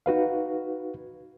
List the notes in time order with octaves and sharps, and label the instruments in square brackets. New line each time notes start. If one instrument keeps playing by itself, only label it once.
[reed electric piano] D#4 F#4 B4 F5